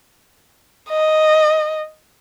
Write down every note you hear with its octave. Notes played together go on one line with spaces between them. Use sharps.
D#5